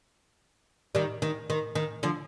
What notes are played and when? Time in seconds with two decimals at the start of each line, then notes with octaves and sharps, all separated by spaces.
0.95 D#3 G3
1.22 D#3
1.50 D#3
1.75 D#3
2.03 D3 F3